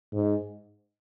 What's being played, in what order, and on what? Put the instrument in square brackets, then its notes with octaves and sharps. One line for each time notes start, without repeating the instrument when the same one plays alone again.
[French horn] G#2